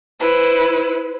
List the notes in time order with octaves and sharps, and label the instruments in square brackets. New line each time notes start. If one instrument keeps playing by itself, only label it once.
[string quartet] E4 B4 C5